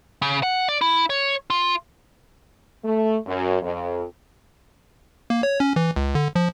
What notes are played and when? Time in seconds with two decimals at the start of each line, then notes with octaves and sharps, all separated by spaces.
0.22 C#3
0.43 F#5
0.69 D5
0.81 E4
1.10 C#5
1.50 F4
2.84 A3
3.26 F#2
3.63 F2
5.30 A#3
5.43 C#5
5.60 C#4
5.76 E3
5.96 C#2
6.15 D3
6.36 F3